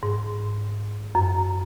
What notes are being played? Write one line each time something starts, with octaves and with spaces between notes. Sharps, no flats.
G#2
F#2